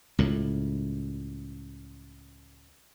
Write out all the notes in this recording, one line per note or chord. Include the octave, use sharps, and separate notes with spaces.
C#2 A2